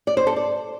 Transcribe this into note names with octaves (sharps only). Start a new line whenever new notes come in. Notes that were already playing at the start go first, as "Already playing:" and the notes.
D5
C5
A4
D5